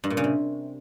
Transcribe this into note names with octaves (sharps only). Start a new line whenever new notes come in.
G2
A#2
C#3
C3